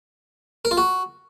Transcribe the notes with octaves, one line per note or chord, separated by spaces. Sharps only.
A#4
F4
F#4